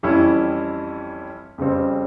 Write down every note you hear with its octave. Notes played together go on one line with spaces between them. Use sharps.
F2 E3 G3 C#4 E4
F2 C#3 G3 C4